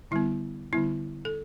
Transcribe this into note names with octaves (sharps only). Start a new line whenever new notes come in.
D3 G3 B3 E4
D3 G3 B3 E4
A4